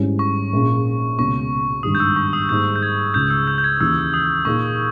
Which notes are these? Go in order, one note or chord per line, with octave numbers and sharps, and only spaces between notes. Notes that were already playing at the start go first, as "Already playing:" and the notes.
Already playing: G#1 G#2 G3 C#4 E4
C#6
A#1 A#2 A#3 C#4 G#4
C#2 B2 A#3 C#4 C#6
G#1 G2 D#3 G3 D#6
G6
E6
C#6
D#6
G#2 G3 A#3 G6
G6
G#6
C#2 C#3 G#3 G6
E6
G6
G6
G#6
D#2 C#3 E3 E6
D#6
A#2 A#3 D#4 G#4 C#6